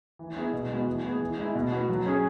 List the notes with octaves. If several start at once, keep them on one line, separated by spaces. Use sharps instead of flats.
E3
B3 E4 G#4
B2
G#3 B3 F#4
E3
B3 G#4
E3
G#3 E4
B2
B3 F#4
F#3
C#4 G#4